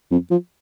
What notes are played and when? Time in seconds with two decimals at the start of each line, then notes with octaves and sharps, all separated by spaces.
0.11 F2
0.30 F3